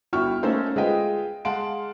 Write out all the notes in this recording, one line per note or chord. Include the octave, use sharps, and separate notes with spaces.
G1 E4 F#4 G5 C#6 F6
A3 A#3 C#4 D#4 A4 C5
G#3 F4 B4 D#5 G5
G#3 F5 F#5 A5 C6 D7